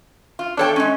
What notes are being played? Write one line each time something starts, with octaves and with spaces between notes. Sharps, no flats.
F4
E2 D4 A4 C#5 G5
G#3 C#4